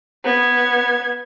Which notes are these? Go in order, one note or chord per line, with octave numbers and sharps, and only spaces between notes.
B3 G#6